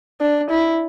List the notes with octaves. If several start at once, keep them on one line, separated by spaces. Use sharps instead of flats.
D4
E4